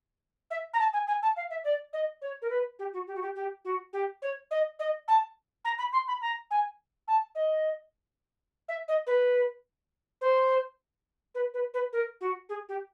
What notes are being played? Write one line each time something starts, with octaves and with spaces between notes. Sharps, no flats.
E5
A#5
A5
G#5
G#5
A5
F5
E5
D5
D#5
C#5
A#4
B4
G4
F#4
G4
F#4
G4
G4
F#4
G4
C#5
D#5
D#5
A5
A#5
B5
C6
B5
A#5
G#5
A5
D#5
E5
D#5
B4
C5
B4
B4
B4
A#4
F#4
G#4
G4